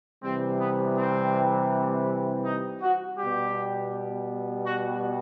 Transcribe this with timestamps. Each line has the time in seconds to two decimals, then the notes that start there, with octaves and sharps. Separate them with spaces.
0.23 C3 E3 G3 C4
0.59 B3
0.97 C4
2.44 D#4
2.81 F#4
3.18 B2 G3 G4
4.65 F#4